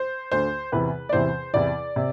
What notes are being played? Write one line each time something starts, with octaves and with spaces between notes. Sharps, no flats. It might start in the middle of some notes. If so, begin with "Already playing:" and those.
Already playing: C5
D2 D3 C5
E2 C3 E3 B4
D5
E2 C3 E3 C5
E2 C3 E3 D5
C3